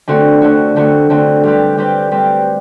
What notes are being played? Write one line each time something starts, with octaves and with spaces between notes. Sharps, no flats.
D3 A3 C4 F#4
D3 A3 C4 F#4
D3 A3 C4 F#4
D3 A3 C4 F#4
G3 C4 G4 B4
G3 C4 G4 B4
G3 C4 G4 B4